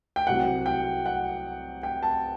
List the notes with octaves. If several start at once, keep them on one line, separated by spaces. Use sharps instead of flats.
G5
C2 C3 F#3 F#5
G5
F#5
G5
A5